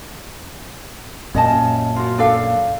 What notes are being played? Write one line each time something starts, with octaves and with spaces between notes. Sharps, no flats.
F#2 A#2 C#4 D#5 A5
F4 F#4
D4 A4 F5